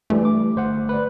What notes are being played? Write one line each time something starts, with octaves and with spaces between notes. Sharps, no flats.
G2 E3 G3 A3
D6
G1 C5 F#5
B4 D5